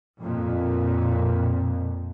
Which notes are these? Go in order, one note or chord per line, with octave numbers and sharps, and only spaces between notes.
F2 A#2